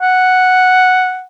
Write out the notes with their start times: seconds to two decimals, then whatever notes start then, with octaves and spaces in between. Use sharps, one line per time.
0.02 F#5